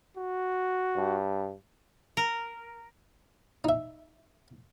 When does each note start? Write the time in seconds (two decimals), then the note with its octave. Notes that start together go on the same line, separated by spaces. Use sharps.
0.17 F#4
0.96 G2
2.17 A#4
3.64 D#4 E5